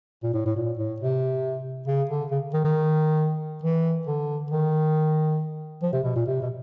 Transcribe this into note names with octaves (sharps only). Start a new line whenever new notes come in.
A#2
A2
A2
A#2
A2
C3
C#3
D3
C#3
D#3
D#3
E3
D3
D#3
F3
C3
B2
A#2
C3
B2